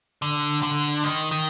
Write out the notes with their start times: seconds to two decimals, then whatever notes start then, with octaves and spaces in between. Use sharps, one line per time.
0.22 D3
0.63 D3
1.04 D#3
1.31 D#3